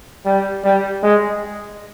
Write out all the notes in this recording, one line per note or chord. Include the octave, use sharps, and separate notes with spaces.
G3
G3
G#3